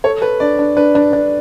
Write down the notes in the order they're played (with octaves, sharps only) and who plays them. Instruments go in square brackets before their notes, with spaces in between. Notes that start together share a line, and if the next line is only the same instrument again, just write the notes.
[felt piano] A4 [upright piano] C#5
[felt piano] A4 [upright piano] B4
[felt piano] D4 [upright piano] D5
[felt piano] D4
[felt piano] D4 [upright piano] B4
[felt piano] D4
D4